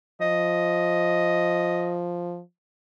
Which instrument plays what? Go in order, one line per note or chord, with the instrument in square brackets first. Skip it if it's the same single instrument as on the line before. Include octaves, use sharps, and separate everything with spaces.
[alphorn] F3 [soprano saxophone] D#5